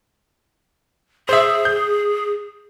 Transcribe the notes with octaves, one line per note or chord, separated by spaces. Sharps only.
G#4 C5 E5
G6